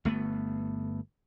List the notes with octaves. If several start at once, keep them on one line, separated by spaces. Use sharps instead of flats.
G1 A3 B3